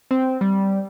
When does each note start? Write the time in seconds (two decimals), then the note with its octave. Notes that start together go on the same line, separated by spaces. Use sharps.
0.11 C4
0.41 G3